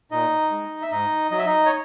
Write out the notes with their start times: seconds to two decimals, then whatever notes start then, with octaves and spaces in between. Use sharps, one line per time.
0.11 A#2 D#4 D#5
0.51 G#3
0.82 E5
0.91 G#2 D#4 D#5
1.31 F#3 D#5
1.38 E5
1.46 D#4 D#5
1.66 C#5